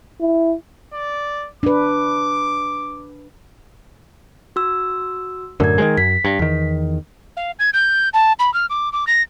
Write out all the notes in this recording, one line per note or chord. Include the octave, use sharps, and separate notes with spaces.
E4
D5
D4 B4 D6
F#4 E6
F#2 A2 D3 A#4 G#6
D#3 F#3 G#3
F#2 B6
G2
E2 D#3
F5
G#6
G6
A5
B5
F6
D6
D6
A#6